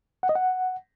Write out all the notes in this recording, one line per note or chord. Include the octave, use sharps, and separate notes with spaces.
F#5
D#5
F#5